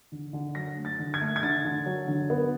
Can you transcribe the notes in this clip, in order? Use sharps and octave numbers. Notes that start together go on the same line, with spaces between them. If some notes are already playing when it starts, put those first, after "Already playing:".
D3
D3
F#3 A#6
A3
A6
D3
G#6
A3
G#6
D3 A6
D3
F#3
D3
B3